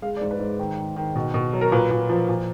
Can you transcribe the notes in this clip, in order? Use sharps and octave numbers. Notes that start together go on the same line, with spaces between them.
G#3 F5
D5
G#2
B4
G#2
D#3
D#3
D#3
B2
B2
F#3
A#4
A#2 B4
A#2
F3
A#2